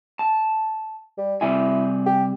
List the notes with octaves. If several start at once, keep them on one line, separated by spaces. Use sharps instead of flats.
A5
G3
C3 G3 E4 G#5
G4